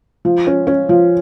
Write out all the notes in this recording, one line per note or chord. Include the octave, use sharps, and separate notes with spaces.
F3
C#4
C#4
F3